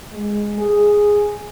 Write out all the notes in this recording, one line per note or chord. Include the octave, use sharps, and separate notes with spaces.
G#3
G#4